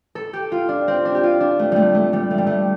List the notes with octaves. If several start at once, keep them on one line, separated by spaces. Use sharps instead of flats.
A4
G4
F4
D4
C4
D4
G4
F4
D4
A3
G3 A3
A3
G3
A3
G3
A3